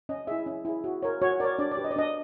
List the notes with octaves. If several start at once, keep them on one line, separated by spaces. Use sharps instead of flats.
C#4 D#5
E4 G#4 E5
C#4
E4 G#4
F#4
A#4 C#5
F#4 C#5
A#4 C#5 D5
D4 D5
D5
G4 B4
D#5
D5
D4 D#5